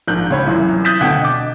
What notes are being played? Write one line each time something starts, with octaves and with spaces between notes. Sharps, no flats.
A#1 G#2 A#4 F#6 G6
C#2 C#5 B5
C2 F#2 E3
D#6 F#6 G6 A6 B6 E7
D2 B2 F#5 G5 G#6
D#5 D6